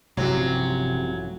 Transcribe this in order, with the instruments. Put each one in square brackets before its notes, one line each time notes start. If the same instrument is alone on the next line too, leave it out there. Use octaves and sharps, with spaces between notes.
[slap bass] A1 G2 F3 [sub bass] C3 [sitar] F#3 [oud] C4 F#4 G4